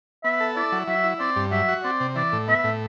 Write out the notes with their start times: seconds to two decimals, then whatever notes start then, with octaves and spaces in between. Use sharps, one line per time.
0.24 B3 E5
0.40 A4
0.56 E4 D5
0.72 F#3
0.88 F#3 E5
1.04 E4
1.20 C4 D5
1.36 G2
1.52 F#3 E5
1.69 F#4
1.84 C4 D5
2.00 C3
2.16 E3 D5
2.32 A2
2.48 B3 E5
2.64 A2